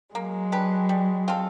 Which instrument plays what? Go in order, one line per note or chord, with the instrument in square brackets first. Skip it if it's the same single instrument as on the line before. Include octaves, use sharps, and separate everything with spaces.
[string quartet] F#3 G#3 [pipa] A#3
[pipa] D4 G4 B4
G3
C4 F4 A4